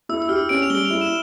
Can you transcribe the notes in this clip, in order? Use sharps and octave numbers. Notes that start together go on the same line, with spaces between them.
E4 E6
E6
G4 F6
C#4 D7
F7
G3 G7
F7
E4
E7